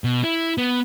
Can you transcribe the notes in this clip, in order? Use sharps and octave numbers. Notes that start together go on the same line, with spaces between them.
B2
E4
B3